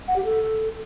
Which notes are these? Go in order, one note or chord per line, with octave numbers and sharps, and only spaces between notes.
F#5
G4
A4